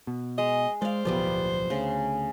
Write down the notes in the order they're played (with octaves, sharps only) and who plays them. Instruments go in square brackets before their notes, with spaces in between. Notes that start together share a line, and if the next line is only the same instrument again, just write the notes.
[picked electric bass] B2
[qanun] G#3 [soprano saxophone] D#5
[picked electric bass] G#3 [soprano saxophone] C5 [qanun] D5 F5
[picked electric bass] D1 B1 F3 [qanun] G3 B3 D5
[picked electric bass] D2 [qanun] C#3